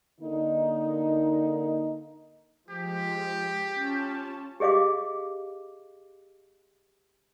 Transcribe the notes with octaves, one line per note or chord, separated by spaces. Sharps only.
D3 A#3 D#4
F3 G#3 G4
C#4 F4 A5
G4 G#4 D#5 F5 D6